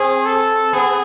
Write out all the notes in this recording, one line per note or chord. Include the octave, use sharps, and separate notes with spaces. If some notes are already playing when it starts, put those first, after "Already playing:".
Already playing: C4 G#4
A4
B3 G#4